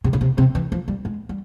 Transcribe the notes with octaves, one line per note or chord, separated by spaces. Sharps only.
C3
C#3
C3
C3
E3
F3
G3
G#3
G3